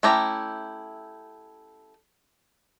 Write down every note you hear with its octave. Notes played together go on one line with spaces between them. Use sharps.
A3 C#4 E4 G4 A#5